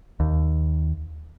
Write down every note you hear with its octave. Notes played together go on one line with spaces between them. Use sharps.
D#2